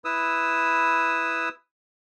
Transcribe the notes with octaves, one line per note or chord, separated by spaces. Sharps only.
E4 B4 D#6 E6